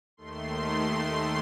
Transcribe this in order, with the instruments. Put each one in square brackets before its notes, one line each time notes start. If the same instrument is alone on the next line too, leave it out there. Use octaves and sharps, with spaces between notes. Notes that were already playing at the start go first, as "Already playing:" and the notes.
[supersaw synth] D#2 D#3 A3 C6